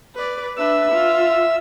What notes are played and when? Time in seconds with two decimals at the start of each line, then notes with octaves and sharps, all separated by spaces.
0.15 B4 D5
0.57 D4 B4 E5 E6
0.92 F4